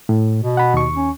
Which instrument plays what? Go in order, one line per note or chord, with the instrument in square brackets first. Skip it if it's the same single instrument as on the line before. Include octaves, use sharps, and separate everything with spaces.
[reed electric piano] A2
[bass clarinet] B2
[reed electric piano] F#5 B5
D#2 C#6
[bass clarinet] C#4